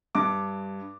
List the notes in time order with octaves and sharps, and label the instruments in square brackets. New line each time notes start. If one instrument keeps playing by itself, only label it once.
[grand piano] G2 D6